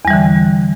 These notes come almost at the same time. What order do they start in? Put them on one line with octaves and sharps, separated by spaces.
E2 G3 E3 D3